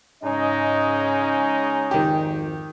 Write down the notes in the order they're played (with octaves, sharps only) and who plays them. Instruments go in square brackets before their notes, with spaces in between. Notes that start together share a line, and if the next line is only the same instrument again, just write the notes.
[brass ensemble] G#2 D#5 [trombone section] C#3 G#3 D#4 [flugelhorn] C#4
[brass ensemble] G#1 F2 [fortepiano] D#3 G4